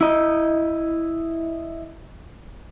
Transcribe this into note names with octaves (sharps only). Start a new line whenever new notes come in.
E4 D#5